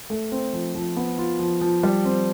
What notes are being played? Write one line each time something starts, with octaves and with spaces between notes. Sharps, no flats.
A3
C4
F3
F3
B3
F4
F3
F3
G3
C4